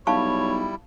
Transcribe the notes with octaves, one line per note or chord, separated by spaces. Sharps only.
B1 G3 E4 C#5 F5 A5 C#6